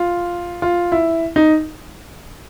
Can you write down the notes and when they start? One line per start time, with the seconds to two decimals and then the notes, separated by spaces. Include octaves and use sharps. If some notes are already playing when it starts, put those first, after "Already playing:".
Already playing: F4
0.62 F4
0.92 E4
1.36 D#4